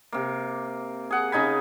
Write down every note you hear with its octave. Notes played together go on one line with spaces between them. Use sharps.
C3 A#3
G#4 F#5
C#3 D#4 G#5 B5